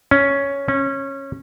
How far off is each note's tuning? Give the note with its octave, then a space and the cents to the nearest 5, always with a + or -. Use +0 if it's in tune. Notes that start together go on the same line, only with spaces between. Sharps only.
C#4 +5
C#4 -20